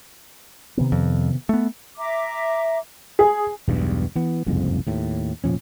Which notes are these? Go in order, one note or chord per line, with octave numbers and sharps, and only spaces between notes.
C3 D#3 B3
F2
A3 B3
E5 A#5 D6
G#4
E1 B1 E2 G2
E3 B3
F#1 C2 F2 G#2
D#2 A2
F1 A#2 F3 C#4